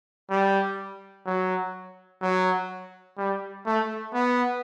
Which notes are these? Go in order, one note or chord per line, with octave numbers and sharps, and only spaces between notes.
G3
F#3
F#3
G3
A3
B3